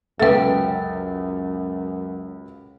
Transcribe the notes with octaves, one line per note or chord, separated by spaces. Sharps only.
C#2 F#2 A4 B4 E5 G5 A6